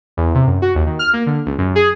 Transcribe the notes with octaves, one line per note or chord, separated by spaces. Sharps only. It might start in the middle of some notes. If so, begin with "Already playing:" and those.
E2
C3
F#2
F#4
D#2
D#3
F6
A#3
D3
C#2
F#2
G#4